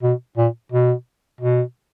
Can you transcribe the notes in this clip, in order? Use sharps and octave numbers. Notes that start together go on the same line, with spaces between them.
B2
A#2
B2
B2